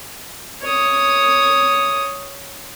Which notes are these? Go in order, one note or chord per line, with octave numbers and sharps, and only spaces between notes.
C#5 D#6